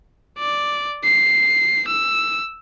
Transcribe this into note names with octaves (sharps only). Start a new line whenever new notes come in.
D5
C7
E6